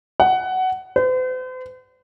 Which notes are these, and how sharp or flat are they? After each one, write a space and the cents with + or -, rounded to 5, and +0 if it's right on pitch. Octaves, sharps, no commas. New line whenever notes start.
F#5 +15
C5 -45